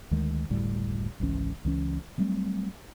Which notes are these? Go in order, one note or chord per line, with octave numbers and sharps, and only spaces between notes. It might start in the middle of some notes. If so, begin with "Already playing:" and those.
D2 D#3 G#3
F#1 D2 A2 G3
G#1 C#2 E3 C#4
C#2 E3 C#4
F#3 G3 A3 C4